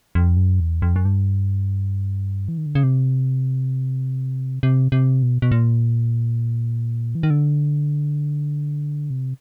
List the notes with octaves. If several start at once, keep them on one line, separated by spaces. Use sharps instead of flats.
F2
F#2
E2
F2
F#2
G2
E3
D#3
D3
C#3
C3
C3
C3
B2
B2
A#2
E3
D#3
D3
C3